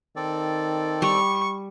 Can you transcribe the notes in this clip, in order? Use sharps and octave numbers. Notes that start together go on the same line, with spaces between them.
D#3 C4 A4 D5
G3 C#6